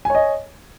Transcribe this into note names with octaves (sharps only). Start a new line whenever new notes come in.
C#5 D#5 G#5